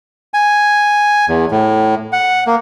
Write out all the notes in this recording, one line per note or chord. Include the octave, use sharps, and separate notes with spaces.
G#5
E2
A2
F#5
A#3